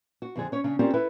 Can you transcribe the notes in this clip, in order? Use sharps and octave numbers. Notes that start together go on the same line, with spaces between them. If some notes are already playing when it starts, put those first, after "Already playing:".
F#4
F2 D3 G#4
C#4 C#5
C#3 C#4 D4
C4 C#4 F4 G4 A#4 D5
E4 A4 B4